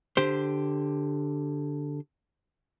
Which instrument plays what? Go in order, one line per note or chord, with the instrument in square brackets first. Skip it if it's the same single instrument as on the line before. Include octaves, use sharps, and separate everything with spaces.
[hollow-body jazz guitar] D3 G4 C5